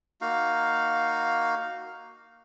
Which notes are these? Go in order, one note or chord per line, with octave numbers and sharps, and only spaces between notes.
A#3 D#4 F#4 F5